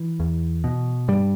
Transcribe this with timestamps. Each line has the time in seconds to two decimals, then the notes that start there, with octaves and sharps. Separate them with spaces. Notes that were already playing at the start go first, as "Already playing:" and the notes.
Already playing: E3
0.20 E2
0.64 B2
1.08 G2 G3